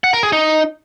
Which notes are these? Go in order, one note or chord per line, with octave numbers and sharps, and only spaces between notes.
F#5
A#4
G#4
D#4